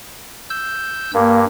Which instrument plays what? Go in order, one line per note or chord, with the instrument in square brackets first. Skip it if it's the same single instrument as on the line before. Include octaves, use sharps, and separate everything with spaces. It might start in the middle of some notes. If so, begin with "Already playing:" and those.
[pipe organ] E6 G6
[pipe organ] G2 [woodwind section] A#3